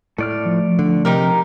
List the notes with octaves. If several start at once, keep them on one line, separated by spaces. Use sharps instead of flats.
A2 A3 D5 F6
F3
D3
C3 D#4 G4 A#4